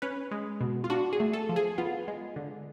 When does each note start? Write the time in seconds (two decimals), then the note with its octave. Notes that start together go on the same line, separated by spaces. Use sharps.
0.02 C#4 B4
0.31 G#3
0.61 B2
0.84 F4
0.90 D4 F#4
1.13 G#4
1.20 A3
1.33 A4
1.49 F3
1.56 G#4
1.78 B3 F4
2.08 G#3
2.36 D3